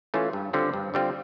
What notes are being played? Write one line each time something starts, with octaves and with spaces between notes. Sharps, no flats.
E3 A3 C#4 F4
G2
D3 G3 C4 F4
G2
D3 G3 C4 F4